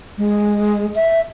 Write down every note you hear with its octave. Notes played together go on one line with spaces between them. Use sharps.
G#3
E5